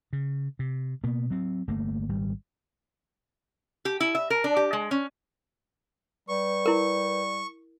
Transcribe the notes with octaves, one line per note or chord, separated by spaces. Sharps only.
C#3
C3
B2 A#3 B3
F#3 C4
G1 A3 A#3
G#1 G3
G4
E4
E5
A#4
D4
G4
G#3
C#4
G3 B4 C#6
E4 A#4